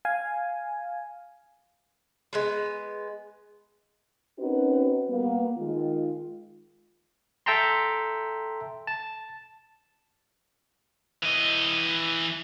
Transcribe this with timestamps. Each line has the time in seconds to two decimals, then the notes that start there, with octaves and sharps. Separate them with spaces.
0.05 F5 G#5
2.33 G#3 B3 B4
4.39 C4 C#4 D#4 F#4 A#4 B4
5.09 G3 A#3 B3
5.57 D#3 G#3 F4
7.46 A4 E5 G5 A5 A#5 C6
8.87 A5
11.23 E3 D#5